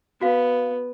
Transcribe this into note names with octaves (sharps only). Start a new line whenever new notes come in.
B3 F#4 F5